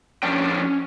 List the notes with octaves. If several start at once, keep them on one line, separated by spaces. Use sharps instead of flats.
F2 C#4 D4 G5